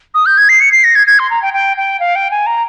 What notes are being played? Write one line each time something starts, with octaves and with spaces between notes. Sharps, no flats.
D#6
G6
G#6
C7
C#7
C7
A#6
G#6
G#6
C6
A#5
G5
G5
G5
F5
G5
G#5
A#5